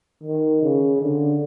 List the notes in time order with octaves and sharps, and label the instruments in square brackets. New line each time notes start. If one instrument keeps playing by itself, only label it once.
[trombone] D#3
C#3
D3